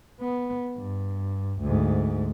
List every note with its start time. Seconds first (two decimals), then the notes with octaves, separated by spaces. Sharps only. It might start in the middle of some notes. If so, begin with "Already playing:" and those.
0.21 B3
0.77 G2
1.61 D2 G#2